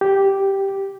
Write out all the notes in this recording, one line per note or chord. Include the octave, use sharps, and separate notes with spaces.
G4